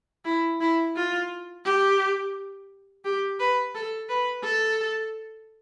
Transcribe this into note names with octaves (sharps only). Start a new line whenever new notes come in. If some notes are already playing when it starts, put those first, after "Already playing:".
E4
E4
F4
G4
G4
B4
A4
B4
A4